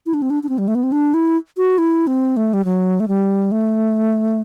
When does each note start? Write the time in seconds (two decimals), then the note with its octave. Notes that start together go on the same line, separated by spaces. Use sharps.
0.06 E4
0.14 D4
0.22 C4
0.30 D4
0.43 D4
0.49 C4
0.58 G3
0.68 A3
0.75 B3
0.83 C4
0.92 D4
1.14 E4
1.57 F#4
1.78 E4
2.07 C4
2.37 A3
2.53 G3
2.65 F#3
3.00 A3
3.08 G3
3.52 A3